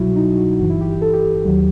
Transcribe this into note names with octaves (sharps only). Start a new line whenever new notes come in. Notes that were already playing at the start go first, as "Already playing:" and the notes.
Already playing: C2 B2 F#3 E4 F#4
D#4
F#4
G1 G2 E3 F#4
E4
G4
G4
A4
G4
D#2 D#3 F#3